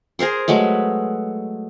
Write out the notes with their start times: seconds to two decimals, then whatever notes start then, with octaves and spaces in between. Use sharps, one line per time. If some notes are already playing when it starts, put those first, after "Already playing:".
0.19 G#4 A#4 C5 C6
0.48 F#3 G#3 A3 B4